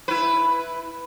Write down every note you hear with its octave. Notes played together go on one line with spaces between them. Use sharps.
E4 B4